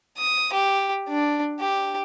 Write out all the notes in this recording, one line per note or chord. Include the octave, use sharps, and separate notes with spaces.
D#6
G4
D4
G4